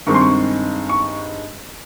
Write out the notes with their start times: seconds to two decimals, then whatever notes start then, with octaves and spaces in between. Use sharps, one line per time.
0.06 G2 D#3 G#3 C4 C#6
0.14 C6
0.21 C#6
0.89 C#6